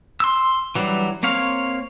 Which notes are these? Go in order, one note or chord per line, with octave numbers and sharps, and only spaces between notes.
C6 E6
E3 F#3 G3 D4
A#3 C4 C#5 F5